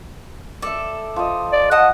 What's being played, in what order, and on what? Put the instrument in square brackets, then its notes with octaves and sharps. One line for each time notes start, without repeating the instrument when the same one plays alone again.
[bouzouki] A4 [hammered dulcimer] D5 E5
[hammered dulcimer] F3 D#5
[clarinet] D5
[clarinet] D#5 [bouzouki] F#5 A5